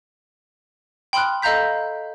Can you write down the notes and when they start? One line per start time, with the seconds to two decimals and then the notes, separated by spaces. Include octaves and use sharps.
1.13 G5 B5 C6 D#6 F6 F#6
1.42 A4 D#5 F5 A#5 G6 B6